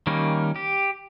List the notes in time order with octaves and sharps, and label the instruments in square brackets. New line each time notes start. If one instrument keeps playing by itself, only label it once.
[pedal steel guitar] D#3 G3 A#3 C#4 D#4
G4